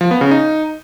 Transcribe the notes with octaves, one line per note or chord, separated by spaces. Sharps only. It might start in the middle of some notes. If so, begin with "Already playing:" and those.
F3
B3
C#3
D#4